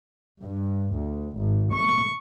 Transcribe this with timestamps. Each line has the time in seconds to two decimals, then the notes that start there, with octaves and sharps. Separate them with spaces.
0.42 G2
0.95 D2
1.37 G#1
1.73 C#6